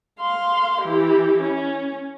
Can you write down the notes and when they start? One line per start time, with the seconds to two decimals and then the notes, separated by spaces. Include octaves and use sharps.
0.20 F5 C6
0.82 E3 G4
1.42 C#4